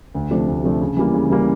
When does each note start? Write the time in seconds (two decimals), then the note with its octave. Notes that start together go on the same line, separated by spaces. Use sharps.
0.15 D2
0.31 C3 F3 A3 D4
0.48 D2
0.64 C3 F3 A3 D4
0.81 C#3
0.97 E3 G3 A#3
1.14 C#3
1.30 E3 G3 A#3